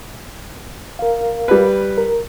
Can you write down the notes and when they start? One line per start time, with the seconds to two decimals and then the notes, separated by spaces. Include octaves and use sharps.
0.99 A#4 F5
1.48 G3 B4
1.98 A#4